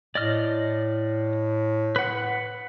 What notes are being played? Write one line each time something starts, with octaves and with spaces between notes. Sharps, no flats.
A2 D5 D#5 F6
B4 F#5